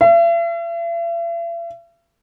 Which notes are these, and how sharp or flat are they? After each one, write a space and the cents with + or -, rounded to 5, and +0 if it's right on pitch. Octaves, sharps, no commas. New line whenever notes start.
E5 +45